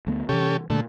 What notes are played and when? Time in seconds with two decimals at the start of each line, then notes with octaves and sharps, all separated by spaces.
0.07 D2 A3 B3
0.29 C3 E3 C#4 G4 A4
0.70 A#2 D3 G3 A3 A#3